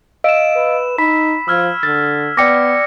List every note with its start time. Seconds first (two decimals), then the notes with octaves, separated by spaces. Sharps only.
0.24 D#5 F5 E6 D7 E7
0.56 B4
0.98 D#4 B5 B6
1.48 F3 E6 F6 G#6
1.83 D3 A6
2.37 B3 D5 G5 D6 A#6 C#7